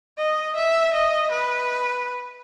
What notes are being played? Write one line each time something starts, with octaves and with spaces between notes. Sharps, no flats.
D#5
E5
D#5
B4